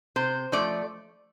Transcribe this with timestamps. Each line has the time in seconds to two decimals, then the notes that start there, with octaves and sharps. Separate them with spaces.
0.16 C3 C5
0.52 F3 A3 D5